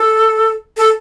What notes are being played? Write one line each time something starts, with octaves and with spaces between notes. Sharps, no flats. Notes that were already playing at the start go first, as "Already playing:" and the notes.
Already playing: A4
A4